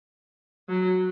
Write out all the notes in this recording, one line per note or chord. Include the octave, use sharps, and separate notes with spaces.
F#3